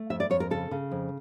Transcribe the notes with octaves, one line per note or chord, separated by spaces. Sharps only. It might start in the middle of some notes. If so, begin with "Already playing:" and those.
Already playing: A3
F2 E5
D5
F2 C#5
A#4
C#3 A4
C#3
F2